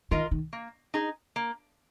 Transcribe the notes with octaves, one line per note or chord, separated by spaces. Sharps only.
D#3 F4 A#4 D#5
D#3
A#3
D#4 G#4
A#3